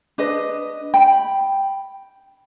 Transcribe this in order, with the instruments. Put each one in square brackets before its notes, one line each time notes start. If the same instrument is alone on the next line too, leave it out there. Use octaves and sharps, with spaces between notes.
[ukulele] D4 B4 D#5
G5 B5